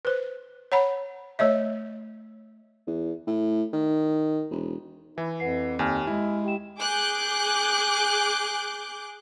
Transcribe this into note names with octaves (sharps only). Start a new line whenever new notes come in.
B4 C5
C#5 F#5 A#5 B5
A3 C#5 D#5 E5
E2
A2
D#3
E1
E3 E4
F2 B4 F#5 C7
D#2 G4 G#5 F6
G#3 E4
G4 G5 E7
G#4 D6 F#6 G6